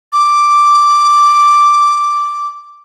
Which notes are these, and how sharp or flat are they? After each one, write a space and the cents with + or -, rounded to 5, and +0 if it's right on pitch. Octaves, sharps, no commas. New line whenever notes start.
D6 +0